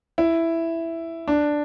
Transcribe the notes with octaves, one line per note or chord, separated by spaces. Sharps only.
E4
D4